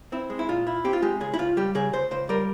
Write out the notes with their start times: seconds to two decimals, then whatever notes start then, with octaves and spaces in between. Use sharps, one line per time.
0.12 C4 E4
0.30 G#3
0.39 E4
0.48 A#2 F4
0.67 E4
0.84 C4 G4
0.93 F4
1.02 G#3 G4
1.21 C#2 G#4
1.34 E4
1.39 C#2 F4
1.57 G3 G4
1.75 C#3 G#4
1.93 C#2 C5
2.11 C#2 C5
2.29 G3 A#4